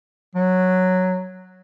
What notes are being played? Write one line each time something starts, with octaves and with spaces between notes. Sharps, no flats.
F#3